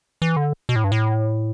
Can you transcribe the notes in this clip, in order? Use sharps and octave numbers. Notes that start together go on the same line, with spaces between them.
E3
D3
B2
A2
G2
A2